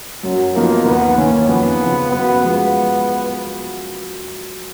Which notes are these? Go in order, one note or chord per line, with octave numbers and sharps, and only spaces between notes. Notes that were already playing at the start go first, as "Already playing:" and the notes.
F#2 F#3
F3 A#3 B3 D#4 A#4
D#2 B3
D#3 A#3 C#4
F2 B3
C#3 F3
F#2 B3
F3 G#3 B3